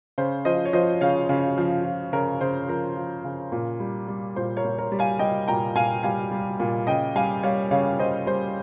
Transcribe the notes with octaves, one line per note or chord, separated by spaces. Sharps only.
C#3 C5
F3 C5 D#5
C#5
F3 C5 D#5
C#3 C#5 F5
C#3
F3
F3
C#3 A#4 C#5
C#3 C5
F3 A#4
F3
C#3
A#2
G3
G3
A#2 C5
A#4 C#5
A#2
A#4 C#5
G3
F5 G#5
G3 D#5 G5
A#2 G5 A#5
A#2 F5 G#5
G3 F5 G#5
G3
A#2
C#3 D#5 G5
G3 F5 G#5
G3 C#5 F5
C#3 C#5 F5
C#3 C5 D#5
G3 C5